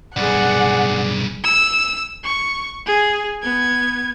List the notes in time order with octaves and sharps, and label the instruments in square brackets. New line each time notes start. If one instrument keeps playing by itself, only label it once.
[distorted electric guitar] B1 G2 [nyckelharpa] G#4 D5 [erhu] F#5
[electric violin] E6
C#6
G#4
B3 G#6